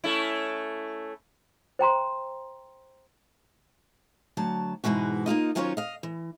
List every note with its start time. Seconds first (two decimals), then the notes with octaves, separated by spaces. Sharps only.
0.04 A3 C#4 E4
1.79 C5 G5 A#5 C6
4.37 D2 F#3 A5
4.84 G#2 B2 E3 G#3 F#4
5.26 A#3 D#4 F4 D#5
5.55 D#3 F#3 C#4 F4 C5 C#5
5.77 D#5 F5
6.03 E3